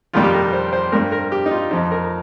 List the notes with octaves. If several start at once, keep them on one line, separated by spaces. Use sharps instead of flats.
F2 D#3 G3 F4
G4
A#4
C5
C5
G2 G3 C4 A#4
A#4
G4
D#4
F4
F2 F3 C4 D#4
A#4